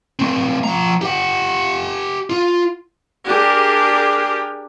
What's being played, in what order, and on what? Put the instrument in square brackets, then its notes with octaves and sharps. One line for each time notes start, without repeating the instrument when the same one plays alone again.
[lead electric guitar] A3 C4
F3 A#5
G4 F#5
F4
[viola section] D4 G4 G#4 A#4